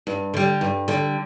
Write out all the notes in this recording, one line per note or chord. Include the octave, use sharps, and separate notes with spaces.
G2
D3 G3
G2
D3 G3